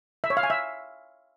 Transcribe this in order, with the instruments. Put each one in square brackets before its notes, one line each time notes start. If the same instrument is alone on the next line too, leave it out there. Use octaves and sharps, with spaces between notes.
[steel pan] E5
C#5
F5
G#5
E5